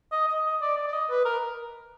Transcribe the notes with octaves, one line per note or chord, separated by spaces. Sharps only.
D#5
D#5
D#5
D5
D5
D5
D#5
B4
A#4